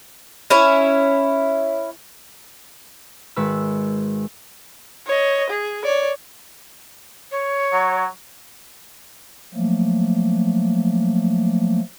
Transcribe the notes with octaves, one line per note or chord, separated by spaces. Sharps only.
C#4 E4 C#5
G#1 B4 E6
C#5 D#5
G#4
C#5 D5
C#5
F#3
F3 F#3 A3 A#3